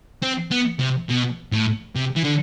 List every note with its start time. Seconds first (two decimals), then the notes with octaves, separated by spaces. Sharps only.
0.22 C4
0.51 B3
0.80 C3
1.09 B2
1.52 A2
1.96 C3
2.16 E3
2.25 D3